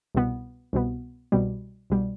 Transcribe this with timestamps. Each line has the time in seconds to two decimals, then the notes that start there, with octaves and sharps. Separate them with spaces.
0.15 C2 B2 B3
0.73 C2 B2 B3
1.32 C2 B2 G3
1.90 C2 B2 G3